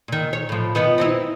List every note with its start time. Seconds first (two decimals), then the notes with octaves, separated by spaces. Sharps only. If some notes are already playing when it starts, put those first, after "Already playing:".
0.08 A#2 D#3
0.33 C#5
0.49 A2 F3
0.75 D#3 B3 F4
0.98 C4 D#4 E4